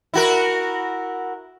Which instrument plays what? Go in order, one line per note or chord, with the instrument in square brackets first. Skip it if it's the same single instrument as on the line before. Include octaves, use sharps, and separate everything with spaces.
[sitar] E4 F#4 A#4